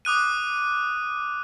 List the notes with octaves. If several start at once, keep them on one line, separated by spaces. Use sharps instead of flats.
D6 D#6 F#6 D#7